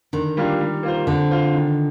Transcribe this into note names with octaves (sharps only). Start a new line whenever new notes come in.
D3 D#3
G3 A#3 D4 F4
G3
A#3 F4 C5
D3 C4
F4 C5
D#3